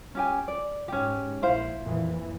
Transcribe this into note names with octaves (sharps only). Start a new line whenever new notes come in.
C#4 G4 G#5
D5
G#2 C#4 G4
A#1 E4 C5 F5
F2 A#2 E3